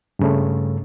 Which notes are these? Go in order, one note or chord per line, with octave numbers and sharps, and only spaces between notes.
G2 C#3 A3